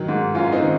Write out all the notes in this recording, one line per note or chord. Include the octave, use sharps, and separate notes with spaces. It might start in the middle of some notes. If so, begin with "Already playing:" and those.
Already playing: D#3 F#3
G#2
F#2 C#4 F4
C4 D#4
D#3